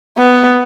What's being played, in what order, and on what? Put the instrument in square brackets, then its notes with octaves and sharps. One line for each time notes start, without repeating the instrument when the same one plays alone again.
[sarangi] B3